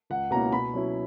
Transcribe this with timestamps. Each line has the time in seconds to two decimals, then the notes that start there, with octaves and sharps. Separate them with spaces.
0.10 C#2 F#5
0.31 B2 A#3 C#4 E4 A#5
0.52 B2 B5
0.74 F#3 C#4 E4